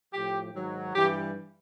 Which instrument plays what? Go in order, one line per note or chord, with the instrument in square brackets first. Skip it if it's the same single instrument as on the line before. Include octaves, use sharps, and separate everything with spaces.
[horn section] A2 F3 G4
G#2 D#3 F#3
G2 E3 G3 G4